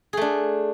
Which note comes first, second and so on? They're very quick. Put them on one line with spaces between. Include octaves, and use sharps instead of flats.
G#4 A3 D4